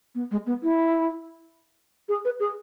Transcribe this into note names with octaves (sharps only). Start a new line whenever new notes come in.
B3
G#3
B3
E4
G#4
B4
G#4